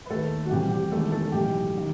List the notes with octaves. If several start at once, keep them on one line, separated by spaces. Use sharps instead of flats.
B4
D#2 D#3 A3 A4
F#4
C2 C3 E3 G4
G4
E1 E2 D#3 A3 A4
A3 A4
B1 A2 E3 G4
D#3